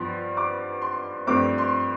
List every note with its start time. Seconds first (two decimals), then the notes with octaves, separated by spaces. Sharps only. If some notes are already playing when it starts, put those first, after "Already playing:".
Already playing: G2 F3 B3 C6
0.37 D6
0.82 C6
1.27 G2 F3 A3 C4 D6
1.58 C6